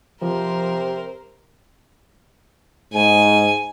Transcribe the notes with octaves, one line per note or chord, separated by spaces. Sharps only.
C3 F3 A#4 C5
G#2 G#5